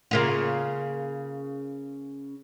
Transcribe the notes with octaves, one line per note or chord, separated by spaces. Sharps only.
C#3 A#3 F4